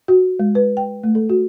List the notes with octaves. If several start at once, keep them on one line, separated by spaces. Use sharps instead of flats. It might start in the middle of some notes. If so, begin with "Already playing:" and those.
F#4
G#3
B4
G5
A3
A4
F#4